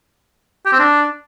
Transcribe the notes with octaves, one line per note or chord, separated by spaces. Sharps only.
G4
C4
D4